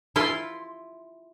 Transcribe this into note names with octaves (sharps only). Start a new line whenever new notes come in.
E4 F4 F5 C6